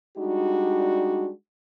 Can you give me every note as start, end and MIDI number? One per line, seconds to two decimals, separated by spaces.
0.18 1.30 55
0.18 1.30 56
0.18 1.30 62
0.18 1.30 63
0.18 1.30 66